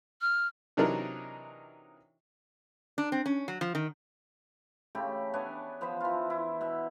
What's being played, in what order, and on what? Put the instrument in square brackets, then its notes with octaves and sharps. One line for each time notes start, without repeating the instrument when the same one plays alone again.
[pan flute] F6
[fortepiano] C3 E3 F#3 D4 D#4 A#4
[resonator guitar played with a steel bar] D4
C4
C#4
F#3
F3
D#3
[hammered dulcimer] C#3 A3 G4 B5
B3 D4 C#5 G#5
F3 B3 C5 B5
E3 F4
E4
B2 E5